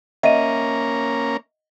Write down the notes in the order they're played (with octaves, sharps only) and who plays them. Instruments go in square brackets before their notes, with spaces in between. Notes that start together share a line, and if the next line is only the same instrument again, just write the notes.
[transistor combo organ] A#3 C#4 A#5 [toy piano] D#5 F#5 [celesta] E5 D#7